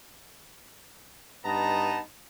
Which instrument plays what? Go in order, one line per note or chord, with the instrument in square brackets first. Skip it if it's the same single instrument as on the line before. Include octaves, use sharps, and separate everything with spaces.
[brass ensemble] G2 B3 D#4 D#5 A5 A#5